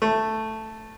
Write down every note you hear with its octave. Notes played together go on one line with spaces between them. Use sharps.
A3